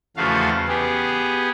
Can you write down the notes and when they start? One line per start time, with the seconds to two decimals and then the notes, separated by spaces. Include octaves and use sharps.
0.17 E2 C#3 F3 A3 F#4 F5
0.68 B3 G4 G#4